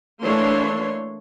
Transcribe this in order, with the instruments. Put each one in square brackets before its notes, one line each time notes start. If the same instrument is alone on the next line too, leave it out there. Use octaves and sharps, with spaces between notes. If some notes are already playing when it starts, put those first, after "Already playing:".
[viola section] E3 A3 A#3 D4 C#5 C6